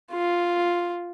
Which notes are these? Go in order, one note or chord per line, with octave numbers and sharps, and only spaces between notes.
F4